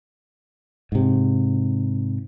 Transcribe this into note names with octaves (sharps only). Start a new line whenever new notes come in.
G#2 C3